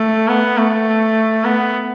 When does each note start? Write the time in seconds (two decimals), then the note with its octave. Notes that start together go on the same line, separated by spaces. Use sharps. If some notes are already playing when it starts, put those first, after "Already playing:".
Already playing: A3
0.28 B3
0.57 A3
1.44 B3